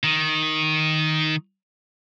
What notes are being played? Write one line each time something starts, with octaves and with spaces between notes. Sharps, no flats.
D#3